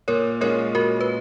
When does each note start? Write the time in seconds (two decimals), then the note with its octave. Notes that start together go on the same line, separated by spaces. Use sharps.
0.08 A#2 A#4 C#5
0.41 G#3 C#4 F4 A#4 C#5
0.74 A#2 F#4 A#4
1.01 B4